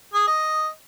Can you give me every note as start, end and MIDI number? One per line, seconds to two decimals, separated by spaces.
0.14 0.26 68
0.27 0.68 75